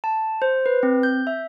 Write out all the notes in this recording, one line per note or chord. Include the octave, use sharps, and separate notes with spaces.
A5
C5
B4
C4
G6
E5